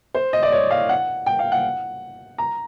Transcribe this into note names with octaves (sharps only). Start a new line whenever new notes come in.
C5
D#5
D5
C#5
F5
F#5
G5
F5
F#5
A#5